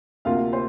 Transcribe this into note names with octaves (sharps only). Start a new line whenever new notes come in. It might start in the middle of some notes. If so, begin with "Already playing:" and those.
D2 C3 A#3 F4 F5
C5